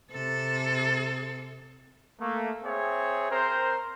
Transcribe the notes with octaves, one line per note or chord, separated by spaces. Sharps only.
C3 A4
A3 A#3
C4 G#4 C#5 E5
C4 A#4 C5